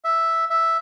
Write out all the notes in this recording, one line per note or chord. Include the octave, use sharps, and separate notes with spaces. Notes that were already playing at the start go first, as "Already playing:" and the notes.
E5
E5